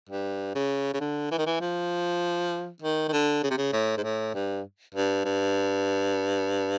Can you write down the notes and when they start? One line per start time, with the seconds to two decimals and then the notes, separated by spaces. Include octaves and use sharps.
0.09 G2
0.55 C#3
0.94 C#3
1.01 D3
1.31 E3
1.38 D#3
1.46 E3
1.61 F3
2.82 D#3
3.08 D#3
3.13 D3
3.43 C#3
3.51 C3
3.57 C#3
3.73 A2
3.98 G#2
4.04 A2
4.34 G2
4.95 G2
5.25 G2